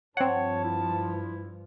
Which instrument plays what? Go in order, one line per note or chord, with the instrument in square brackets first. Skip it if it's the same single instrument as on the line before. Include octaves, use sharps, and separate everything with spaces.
[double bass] G2 F3 [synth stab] C4 F#5 [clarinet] C#5 [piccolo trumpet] A5
[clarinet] E4